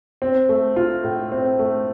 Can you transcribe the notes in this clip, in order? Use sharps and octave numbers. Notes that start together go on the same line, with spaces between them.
C4
A3
F4
A2
C4
A3